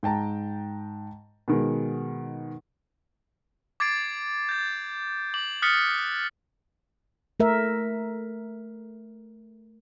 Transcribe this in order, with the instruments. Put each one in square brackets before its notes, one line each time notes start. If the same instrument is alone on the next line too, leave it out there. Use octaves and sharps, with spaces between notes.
[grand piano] G#2 G5 A5 A#5
B2 D#3 G#3
[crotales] D6 G#6 A6 C7 D7
G6 A6
D6 F#7
D#6 F6 F#6 A6 B6 C#7
[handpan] A3 A#4 E5